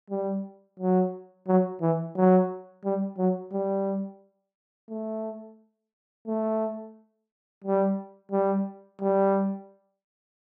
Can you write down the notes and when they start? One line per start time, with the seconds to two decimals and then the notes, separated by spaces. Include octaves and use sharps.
0.10 G3
0.80 F#3
1.48 F#3
1.81 E3
2.17 F#3
2.85 G3
3.18 F#3
3.53 G3
4.90 A3
6.27 A3
7.64 G3
8.32 G3
9.01 G3